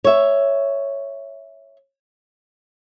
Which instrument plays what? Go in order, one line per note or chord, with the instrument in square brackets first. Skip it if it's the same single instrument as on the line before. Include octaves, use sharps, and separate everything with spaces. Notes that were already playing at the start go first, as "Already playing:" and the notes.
[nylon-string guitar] C#5 E5